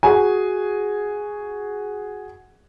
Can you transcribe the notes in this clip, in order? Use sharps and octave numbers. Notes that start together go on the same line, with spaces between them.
F#4 G#4 G#5